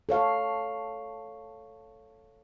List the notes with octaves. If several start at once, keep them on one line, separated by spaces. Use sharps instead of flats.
A4 C#5 F5